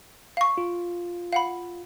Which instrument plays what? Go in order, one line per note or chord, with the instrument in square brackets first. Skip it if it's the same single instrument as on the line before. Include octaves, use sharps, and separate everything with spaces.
[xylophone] F5 C#6
[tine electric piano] F4
[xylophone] F5 F#5 B5